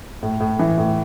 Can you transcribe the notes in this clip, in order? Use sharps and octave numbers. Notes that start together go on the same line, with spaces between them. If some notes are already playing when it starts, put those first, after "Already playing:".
A2
A2
E3
A2